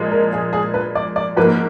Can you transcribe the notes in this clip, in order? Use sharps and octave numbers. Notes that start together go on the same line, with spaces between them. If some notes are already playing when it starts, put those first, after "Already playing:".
Already playing: A#2 F3 G#3
A#4
G#4
G#4
B4
D5
D5
G#2 F3 A#3 B4